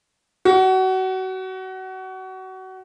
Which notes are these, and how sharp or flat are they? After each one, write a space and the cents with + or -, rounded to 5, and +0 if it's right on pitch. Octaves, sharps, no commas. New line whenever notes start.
F#4 +25